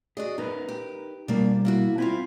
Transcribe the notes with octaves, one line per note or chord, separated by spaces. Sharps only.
F#4 G#4 D5 D#5
B3 D#4 A#4 B4
G4
B2 G3 A#3 D4
A#3 E4 F#4
C4 E4 F4 C5 G#5